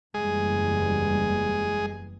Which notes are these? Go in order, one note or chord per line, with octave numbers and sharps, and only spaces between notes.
F#1 E2 G3 G#3 G#4